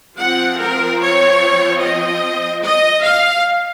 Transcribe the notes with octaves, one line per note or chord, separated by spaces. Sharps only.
F3 C4 F#5
A#4
C#5
D#5
D#5
F5